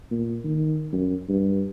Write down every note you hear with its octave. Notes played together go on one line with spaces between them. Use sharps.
A#2
D#3
F#2
G2